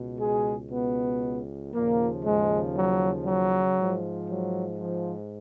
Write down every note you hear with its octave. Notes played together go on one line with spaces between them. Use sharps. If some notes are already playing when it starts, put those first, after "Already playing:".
Already playing: C#2 B2
G#3 G#4
B2 B3
D#2 A#2 C#3 F3 A#3
G#2 G#3
F#3
F#3
G#2 F3
F#3
F3